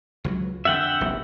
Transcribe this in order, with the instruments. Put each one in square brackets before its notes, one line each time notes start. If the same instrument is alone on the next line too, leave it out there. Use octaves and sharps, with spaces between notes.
[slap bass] C#2 F3 F#3
[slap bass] F2 D3 [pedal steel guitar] E5 F#5 G5
[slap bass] F1 A#1 F2